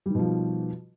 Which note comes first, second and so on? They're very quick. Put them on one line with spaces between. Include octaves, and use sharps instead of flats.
G3 D#3 B2 F3